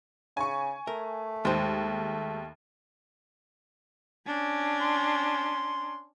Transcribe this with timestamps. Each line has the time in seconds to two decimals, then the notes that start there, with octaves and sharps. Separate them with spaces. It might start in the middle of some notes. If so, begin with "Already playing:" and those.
0.37 C#3 G#5 C#6
0.87 A3 A#4
1.45 D#2 G#3 C5
4.26 C#4 D4
4.82 C6